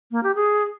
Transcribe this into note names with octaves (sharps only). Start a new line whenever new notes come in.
A#3
G4
G#4